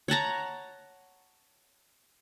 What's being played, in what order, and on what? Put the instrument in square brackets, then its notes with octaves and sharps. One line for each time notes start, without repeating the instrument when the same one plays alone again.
[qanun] C#5 F#5 A5 A#5